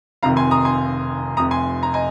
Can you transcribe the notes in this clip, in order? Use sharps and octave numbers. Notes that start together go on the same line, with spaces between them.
F1 F2 C3 D#3 F5 A#5
G#5 C6
A#5 D#6
G#5 C6
F1 F2 C3 A#5 D#6
G#5 C6
A#5
D#5 G#5